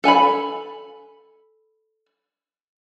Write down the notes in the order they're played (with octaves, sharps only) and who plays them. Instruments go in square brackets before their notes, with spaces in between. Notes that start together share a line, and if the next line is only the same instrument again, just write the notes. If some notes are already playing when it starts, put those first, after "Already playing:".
[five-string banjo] A4 G#5 A#5 B5